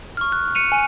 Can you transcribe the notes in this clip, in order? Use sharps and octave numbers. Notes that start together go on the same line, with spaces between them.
C#6 F6
F#6
C#7 D#7 F7
G#5